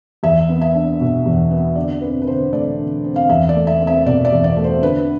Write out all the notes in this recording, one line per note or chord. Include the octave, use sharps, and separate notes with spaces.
E2 E5
B3
E5
D4
B2
E2
B3
D3 D5
C4 B4
B4
D3 C5
A3 D5
D3
C4
F5
E2 E5
D5
A3
E5
C4
E5
B2 D5
D5
E2
D5
A3
C5
D3 B4